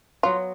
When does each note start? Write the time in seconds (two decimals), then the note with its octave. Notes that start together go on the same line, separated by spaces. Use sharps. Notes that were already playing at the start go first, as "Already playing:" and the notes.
0.23 F#3 B3 F4 F#4